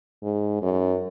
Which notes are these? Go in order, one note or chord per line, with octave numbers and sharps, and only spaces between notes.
G#2
F#2